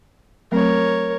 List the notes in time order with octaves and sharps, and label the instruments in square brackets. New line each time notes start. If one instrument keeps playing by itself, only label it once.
[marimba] F#3 A3 C4 [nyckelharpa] A#4 C#5